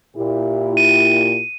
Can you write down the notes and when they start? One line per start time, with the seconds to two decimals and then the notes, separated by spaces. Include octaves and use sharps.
0.16 A#2 E4 G4
0.77 D#7